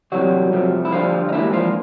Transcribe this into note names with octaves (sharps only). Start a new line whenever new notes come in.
C3 E3 F#3 G3 F#4
C2 C3 F3 A3
E4
D2 D3 F3 G3 F4
D#4
G#2 E3 G3 A#3 D4 E4
F3 F4